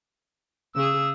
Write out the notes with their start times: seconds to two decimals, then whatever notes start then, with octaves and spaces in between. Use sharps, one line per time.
0.75 C#3 G#4 E6